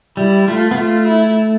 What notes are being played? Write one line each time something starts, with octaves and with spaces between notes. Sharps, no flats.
G3 E4
A3 F4
B3
A3 F4
E4